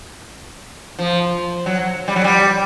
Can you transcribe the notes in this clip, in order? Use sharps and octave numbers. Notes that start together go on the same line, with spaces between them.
F3
F#3
G3
F#3
G3